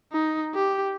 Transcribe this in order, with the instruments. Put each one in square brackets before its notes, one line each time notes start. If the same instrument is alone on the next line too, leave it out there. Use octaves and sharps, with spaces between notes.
[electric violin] D#4
G4